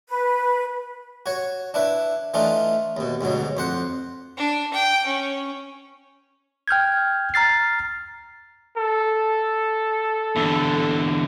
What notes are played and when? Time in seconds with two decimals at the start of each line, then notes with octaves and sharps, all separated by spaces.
0.08 B4
1.26 F#4 C#5
1.74 D4 E4 B4
2.34 E3 A3 D4 D#4 F4
2.97 D#2 B2
3.21 D2 G#2 B2 F#3
3.57 F2 C5 F#5
4.38 D4
4.73 G5
5.06 C#4
6.68 G5 F6 G6 G#6
7.34 A#5 F6 A6 C7
8.77 A4
10.36 E2 D3